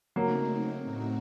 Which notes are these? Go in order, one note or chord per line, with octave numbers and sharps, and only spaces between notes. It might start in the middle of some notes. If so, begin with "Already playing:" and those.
C#3 F#3 A3 A#3 C4 D#4
A2 A3 C4 D#4 F#4